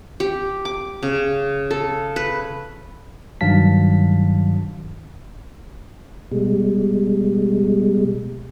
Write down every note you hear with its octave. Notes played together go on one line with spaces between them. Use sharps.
G4
D6
C#3
A4
B4
G2 D#3 F#3 F5 A5 B6
B2 G3 G#3